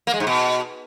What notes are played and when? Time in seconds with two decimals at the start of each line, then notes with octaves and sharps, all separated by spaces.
0.07 A#3
0.14 G#3
0.20 G#2
0.27 B2